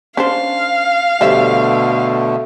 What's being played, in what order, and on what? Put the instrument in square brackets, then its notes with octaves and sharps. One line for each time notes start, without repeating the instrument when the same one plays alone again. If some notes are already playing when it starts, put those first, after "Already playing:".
[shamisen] C#4 D4 C5 [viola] F5
[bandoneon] B2 D3 A3 [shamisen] G3 C5 E5